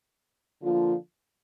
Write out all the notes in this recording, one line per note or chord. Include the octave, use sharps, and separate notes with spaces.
D3 F3 A#3 F4